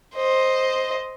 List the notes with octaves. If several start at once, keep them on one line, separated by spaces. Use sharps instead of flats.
C5 D#5